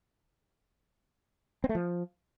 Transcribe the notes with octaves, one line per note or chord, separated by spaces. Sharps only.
C4
A3
F3